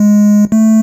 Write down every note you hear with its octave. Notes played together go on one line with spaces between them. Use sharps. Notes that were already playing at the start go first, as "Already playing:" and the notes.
Already playing: G#3
A3